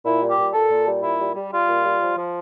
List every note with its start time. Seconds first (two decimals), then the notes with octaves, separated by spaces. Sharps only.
0.05 A#2 E4
0.21 G3
0.30 G4
0.38 A#2
0.54 A#2 A4
0.70 A#2
0.86 G3
1.03 A#2 E4
1.20 G3
1.35 G3
1.52 G3 F4
1.68 A#2
1.84 G3
2.01 F3
2.17 F3